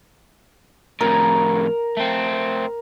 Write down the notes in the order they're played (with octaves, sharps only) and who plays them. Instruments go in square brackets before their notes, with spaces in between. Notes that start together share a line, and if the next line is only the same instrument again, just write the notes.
[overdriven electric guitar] F2 A2 [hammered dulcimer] A#4
[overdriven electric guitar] A3 C4